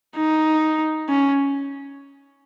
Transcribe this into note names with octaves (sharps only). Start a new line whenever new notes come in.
D#4
C#4